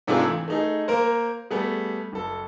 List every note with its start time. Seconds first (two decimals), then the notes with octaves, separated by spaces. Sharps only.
0.07 G#2 C3 A3 D4 F4 G#4
0.26 E3
0.48 A3 D#4 G#4
0.88 A#3 A#4 C5
1.51 G3 A3 B3 G#4
2.13 F#1 A4